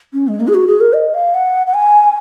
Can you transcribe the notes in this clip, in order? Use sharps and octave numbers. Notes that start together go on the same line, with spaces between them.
C#4
G#3
A#3
G#4
F#4
G#4
A#4
D#5
F5
F#5
F#5
G#5